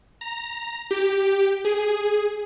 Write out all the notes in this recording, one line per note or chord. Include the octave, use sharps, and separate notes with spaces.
A#5
G4
G#4